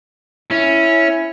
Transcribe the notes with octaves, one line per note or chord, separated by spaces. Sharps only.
C#4 E4